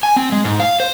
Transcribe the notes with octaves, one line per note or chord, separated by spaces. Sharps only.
G#5
C4
G#3
G#2
F5
C5